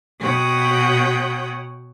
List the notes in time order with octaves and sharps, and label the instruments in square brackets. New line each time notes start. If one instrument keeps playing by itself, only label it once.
[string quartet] B2 C#5 F#5 G5 D#6